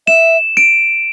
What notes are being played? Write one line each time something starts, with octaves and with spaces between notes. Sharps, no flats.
E5 E7
D7